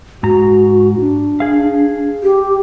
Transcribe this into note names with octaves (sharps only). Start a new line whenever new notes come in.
G#2 F#4 A#5
D4
G#4 F5
G4